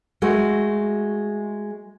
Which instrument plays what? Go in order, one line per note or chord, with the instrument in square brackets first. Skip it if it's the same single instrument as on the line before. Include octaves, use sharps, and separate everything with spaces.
[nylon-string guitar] G#3 A3 F#4